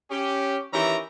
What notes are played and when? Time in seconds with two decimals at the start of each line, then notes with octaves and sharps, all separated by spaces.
0.11 C#4 G4
0.74 D#3 E3 C#4 G4 E5 A#5